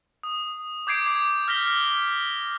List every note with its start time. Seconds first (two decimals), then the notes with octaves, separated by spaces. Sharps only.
0.23 D#6
0.87 D6 G6 G#6 C7 D7
1.07 D6
1.48 F6 G6 A#6 B6 G7